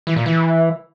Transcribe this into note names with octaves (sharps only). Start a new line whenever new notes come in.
E3
A#2
E3